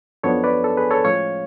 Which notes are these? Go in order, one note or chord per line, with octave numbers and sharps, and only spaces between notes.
F#2 F3 B3 D4 A4 C#5
B4 D5
A4
G#4 B4
A4 C#5
A2 F3 G#3 C#4 C#5 F5